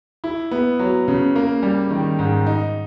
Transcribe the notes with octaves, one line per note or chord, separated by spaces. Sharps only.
E4
B3
F#3
C#3
A#3
G3
D#3
G#2
D#4